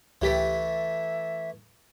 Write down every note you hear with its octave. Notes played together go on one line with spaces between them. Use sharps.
C#2 E3 A3 G4 E5 B6